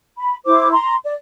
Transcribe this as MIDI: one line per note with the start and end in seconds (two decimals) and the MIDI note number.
0.17 0.37 83
0.45 0.72 64
0.45 0.72 72
0.45 0.72 86
0.73 0.95 82
0.73 0.95 84
1.04 1.15 74